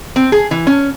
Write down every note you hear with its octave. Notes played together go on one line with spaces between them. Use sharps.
C4
G#4
E3
C#4